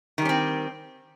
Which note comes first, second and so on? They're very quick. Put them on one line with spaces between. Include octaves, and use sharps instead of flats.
D#3 G3 C#4 C4